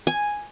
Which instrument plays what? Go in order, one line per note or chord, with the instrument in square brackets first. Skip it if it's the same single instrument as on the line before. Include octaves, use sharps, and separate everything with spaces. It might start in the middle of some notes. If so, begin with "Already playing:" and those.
[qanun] G#5